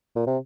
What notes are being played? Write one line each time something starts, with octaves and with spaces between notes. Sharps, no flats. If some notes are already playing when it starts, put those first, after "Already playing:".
A#2
C3